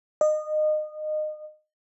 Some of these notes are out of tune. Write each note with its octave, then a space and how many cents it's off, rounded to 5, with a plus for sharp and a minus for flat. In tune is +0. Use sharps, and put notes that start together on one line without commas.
D#5 -25